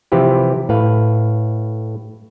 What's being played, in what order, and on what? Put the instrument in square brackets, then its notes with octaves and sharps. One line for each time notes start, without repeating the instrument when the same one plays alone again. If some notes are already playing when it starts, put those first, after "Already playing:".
[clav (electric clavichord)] C3 E3 F3 G4 B4
A2 B4 F5